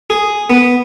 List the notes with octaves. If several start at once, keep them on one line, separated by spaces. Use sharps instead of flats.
G#4
B3